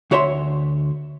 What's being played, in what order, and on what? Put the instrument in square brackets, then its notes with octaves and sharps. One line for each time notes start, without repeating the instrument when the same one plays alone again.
[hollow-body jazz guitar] D2 F#4 C#5 E5 C6